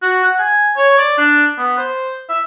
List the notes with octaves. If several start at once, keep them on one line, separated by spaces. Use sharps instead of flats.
F#4
F#5
G#5
C#5
D5
D4
B3
C5
E5